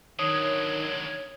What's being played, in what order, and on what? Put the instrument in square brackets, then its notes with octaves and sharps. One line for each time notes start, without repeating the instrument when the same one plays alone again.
[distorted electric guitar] D3 F#3 [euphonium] D#3 [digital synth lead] C#5 [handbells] D#6